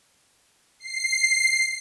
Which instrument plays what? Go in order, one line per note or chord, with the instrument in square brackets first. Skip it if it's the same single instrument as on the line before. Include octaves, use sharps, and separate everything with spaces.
[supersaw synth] C7